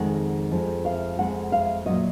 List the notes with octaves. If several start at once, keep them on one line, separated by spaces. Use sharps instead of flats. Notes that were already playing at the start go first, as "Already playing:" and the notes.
Already playing: F2 D#3 G#3 F#5
F2 F3 G#3
F5
F2 D#3 G#3 F#5
F5
A#2 F#3 D#5